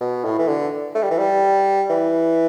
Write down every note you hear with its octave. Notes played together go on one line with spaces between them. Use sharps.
B2
A2
E3
D3
A3
G3
E3
G3
E3